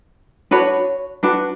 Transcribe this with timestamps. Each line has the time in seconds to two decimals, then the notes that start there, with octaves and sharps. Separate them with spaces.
0.51 D4 F#4 B4 C#5
1.23 D4 F#4 B4